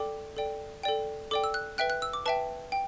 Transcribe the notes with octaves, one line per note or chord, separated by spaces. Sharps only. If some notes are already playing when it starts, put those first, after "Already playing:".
Already playing: A4 D5 G5 D6
A4 D5 G5
A4 D5 G5
A4 D5 G5 D6
E6
F#6
B4 E5 G5 F#6
F#6
E6
D6
B4 E5 G5 A5
G5